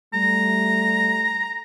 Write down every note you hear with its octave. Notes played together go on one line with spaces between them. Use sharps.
G3 A3 A#5